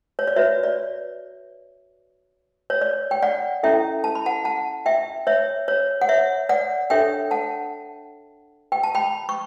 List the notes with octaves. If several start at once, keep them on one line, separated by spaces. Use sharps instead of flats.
C#5
D5
F#4 B4 C#5 E5
D5
C#5
D5
G5
D5 F#5
C#4 E4 A4 E5 G5
A5
B5
F#5 A5
F#5 A5
E5 G5
C#5 E5
C#5
F#5
C#5 E5
D5 F#5
D4 A4 C#5 E5 G5
F#5 A5
G5
A5
G5 B5
C#6